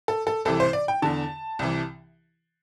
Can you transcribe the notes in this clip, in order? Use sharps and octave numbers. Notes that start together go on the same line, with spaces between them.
A4
A4
C2 C3 E3 A4
C5
D5
G5
E2 D3 A5
C2 C3 E3